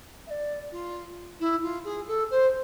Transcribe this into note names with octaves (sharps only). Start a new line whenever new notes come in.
E5
D5
F4
E4
F4
G#4
A4
C5